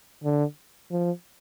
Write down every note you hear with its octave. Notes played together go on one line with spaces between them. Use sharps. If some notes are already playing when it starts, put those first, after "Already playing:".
D3
F3